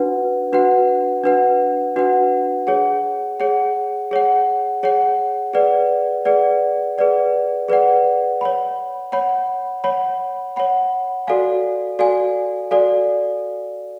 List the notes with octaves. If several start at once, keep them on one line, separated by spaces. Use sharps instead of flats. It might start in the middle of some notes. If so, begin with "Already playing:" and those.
Already playing: D4 F#4 B4 F#5
D4 F#4 B4 F#5
D4 F#4 B4 F#5
D4 F#4 B4 F#5
G#4 C#5 F#5
G#4 C#5 F#5
G#4 C#5 F#5
G#4 C#5 F#5
G#4 B4 D5 F#5
G#4 B4 D5 F#5
G#4 B4 D5 F#5
G#4 B4 D5 F#5
C#5 F#5 B5
C#5 F#5 B5
C#5 F#5 B5
C#5 F#5 B5
F#4 A4 D5 F5 G#5
F#4 A4 D5 F5 G#5
F#4 A4 D5 F5 G#5